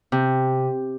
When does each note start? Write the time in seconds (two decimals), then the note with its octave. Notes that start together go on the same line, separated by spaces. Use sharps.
0.12 C3